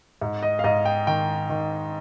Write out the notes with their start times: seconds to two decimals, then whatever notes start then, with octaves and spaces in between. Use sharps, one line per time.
0.21 G#2
0.43 D#5
0.59 F5
0.64 G#2 D#5
0.85 G5
1.07 D#3 G5
1.50 D#3